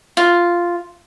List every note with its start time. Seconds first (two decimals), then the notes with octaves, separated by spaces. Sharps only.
0.17 F4